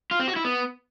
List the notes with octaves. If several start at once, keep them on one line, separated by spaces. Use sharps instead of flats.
F4
C4
F#4
E4
B3